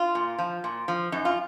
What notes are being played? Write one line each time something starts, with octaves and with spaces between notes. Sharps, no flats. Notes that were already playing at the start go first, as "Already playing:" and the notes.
Already playing: F4
A#2
F3
A#2
F3
F#2 D#4
F4